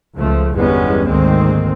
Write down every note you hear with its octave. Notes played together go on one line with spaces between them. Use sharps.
C#2 F3 A3
G1 E2 G3 G#3 B3 C#4
G#1 D2 D#3 G#3 A#3 C4